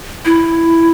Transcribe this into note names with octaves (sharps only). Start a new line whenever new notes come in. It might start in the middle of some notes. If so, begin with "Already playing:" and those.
E4